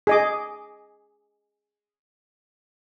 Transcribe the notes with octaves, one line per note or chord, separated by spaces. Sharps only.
G#4 D#5 D6